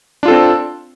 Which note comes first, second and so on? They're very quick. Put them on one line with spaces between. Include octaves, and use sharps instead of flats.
D4 F4 A4 C4